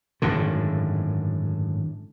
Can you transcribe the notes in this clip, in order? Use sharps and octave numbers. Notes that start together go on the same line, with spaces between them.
G#1 F#2 A2 D3